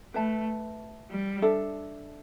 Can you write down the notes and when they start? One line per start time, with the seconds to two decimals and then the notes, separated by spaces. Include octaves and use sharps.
0.14 A3 B4 E5 A5
1.10 G3
1.42 D4 A4 E5